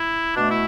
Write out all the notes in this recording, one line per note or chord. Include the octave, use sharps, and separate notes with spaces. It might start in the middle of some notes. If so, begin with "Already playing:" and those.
Already playing: E4
B2 A3 D4
E4